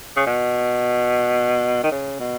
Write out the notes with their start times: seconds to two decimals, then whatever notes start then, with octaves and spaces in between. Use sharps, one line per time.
0.17 C#3
0.27 B2
1.84 D#3
1.91 C#3
2.20 B2